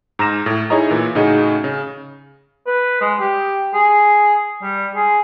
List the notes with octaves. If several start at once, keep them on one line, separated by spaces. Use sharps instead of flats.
G#2 A#5 F6 A#6 E7
A2
D#4 E4 G#4 C#5 D#5 A#5
A#2 E3
A2 C#3 D#4 F#4 G#4
C#3
B4
G#3
G4
G#4
G3
G#4